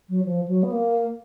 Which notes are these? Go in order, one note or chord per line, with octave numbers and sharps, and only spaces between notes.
F#3
F3
F#3
B3
A#3